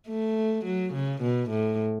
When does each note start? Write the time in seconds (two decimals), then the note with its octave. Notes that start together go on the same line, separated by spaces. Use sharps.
0.08 A3
0.65 F#3
0.94 C#3
1.22 B2
1.50 A2